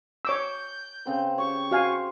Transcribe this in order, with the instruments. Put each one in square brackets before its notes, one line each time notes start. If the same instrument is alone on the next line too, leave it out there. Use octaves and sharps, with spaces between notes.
[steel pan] C#5 D6 E6 [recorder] G6
[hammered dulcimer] C#3 C4 B4
[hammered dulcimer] G4 C#5 [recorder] C#6
[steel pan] F#4 F5 G#5 [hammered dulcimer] C5